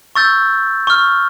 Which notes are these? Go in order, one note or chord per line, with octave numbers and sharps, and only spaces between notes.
C#6 E6 G6 A6
C#6 F6